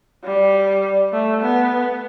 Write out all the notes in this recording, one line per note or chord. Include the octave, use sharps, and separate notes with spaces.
G3
A3
B3